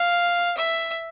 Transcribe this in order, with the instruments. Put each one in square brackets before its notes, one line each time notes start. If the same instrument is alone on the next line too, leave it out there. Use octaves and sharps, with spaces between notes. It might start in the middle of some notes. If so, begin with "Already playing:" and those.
Already playing: [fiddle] F5
E5